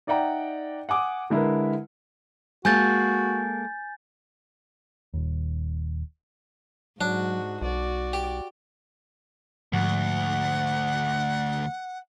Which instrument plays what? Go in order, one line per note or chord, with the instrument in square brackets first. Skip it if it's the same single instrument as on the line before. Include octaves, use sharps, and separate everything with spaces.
[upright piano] D#4 D5 E5 F#5 G5 A#5
F#5 G#5 D6 D#6
D3 G#3 E4 A#4 B4
[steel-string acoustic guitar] G#3 A#3 A4 [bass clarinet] F#4 [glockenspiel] G#5 G6 A6
[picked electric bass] D#1 D#2
[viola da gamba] G#2 F#4 [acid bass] F#3 [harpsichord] D4
[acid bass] B1 [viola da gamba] F#4 D5
[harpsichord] G4
[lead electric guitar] D2 [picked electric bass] G#2 F3 [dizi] F#5